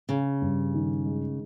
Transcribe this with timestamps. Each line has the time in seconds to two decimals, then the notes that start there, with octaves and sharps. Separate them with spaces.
0.09 C#3 C#4
0.42 G2
0.74 D#3
1.06 G#3